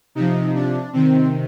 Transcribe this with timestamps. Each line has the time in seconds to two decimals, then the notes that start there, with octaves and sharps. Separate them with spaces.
0.15 C3 F3 D#4
0.55 D4
0.93 C3 D#3 C4